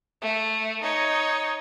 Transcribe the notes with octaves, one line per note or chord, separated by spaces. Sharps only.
A3
D#4 C#5